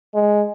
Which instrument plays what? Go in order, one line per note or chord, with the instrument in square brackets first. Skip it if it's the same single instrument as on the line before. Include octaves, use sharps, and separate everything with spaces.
[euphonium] G#3